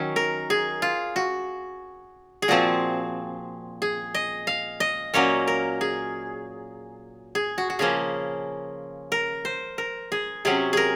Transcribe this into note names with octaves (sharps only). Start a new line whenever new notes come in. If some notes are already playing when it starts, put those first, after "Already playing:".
Already playing: D#3 F#3 C#4
A#4
G#4
F4
F#4
G#4
A#2 F3 C4 F#4
G#4
D#5
F5
D#5
A#2 F#3 A#3 C#4 C#5
A#4
G#4
G#4
F#4
F#4
C#3 F3 A#3 C#4 G#4
A#4
C5
A#4
G#4
C3 F#3 C#4 G#4
G#4 A#4